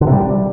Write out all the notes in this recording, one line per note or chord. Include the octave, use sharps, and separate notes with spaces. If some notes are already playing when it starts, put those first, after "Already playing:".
D3
C3
G3